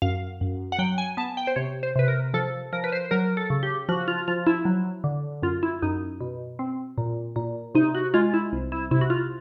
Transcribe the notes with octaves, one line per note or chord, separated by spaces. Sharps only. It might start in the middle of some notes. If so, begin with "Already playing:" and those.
F#2 F5
F#2
F#5
F#3 G5
G#5
B3 A5
G5
C5
C3 C#5
C5
C3 B4
A#4
F3 A4
F3 A#4
B4
C5
F#3 A#4
A4
C#3
G4
F3 F#4
F4
F3 F4
E4
F#3
D3
F#2 F4
E4
F#2 D#4
B2
C4
A#2
A#2
C3 D#4
F#4
G#3 F4
E4
C2
E4
C3 E4
F#4
F4